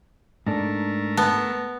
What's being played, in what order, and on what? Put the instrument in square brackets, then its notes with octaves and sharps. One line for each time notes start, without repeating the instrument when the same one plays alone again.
[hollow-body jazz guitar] G#2 D4 A4 [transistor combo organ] A3 A#4
[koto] B3 [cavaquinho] A5